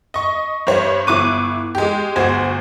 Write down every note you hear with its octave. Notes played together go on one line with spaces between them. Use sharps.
D#5 C#6
G2 C5 C#5
G1 E4 C#6 D6 F#6 D#7
G#3 G4
G1 D2 F#4 C5 G#6